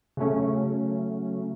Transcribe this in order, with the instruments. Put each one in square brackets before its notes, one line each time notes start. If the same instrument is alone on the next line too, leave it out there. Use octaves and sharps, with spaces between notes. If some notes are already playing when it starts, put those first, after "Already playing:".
[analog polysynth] C#3 F#3 A3 C#4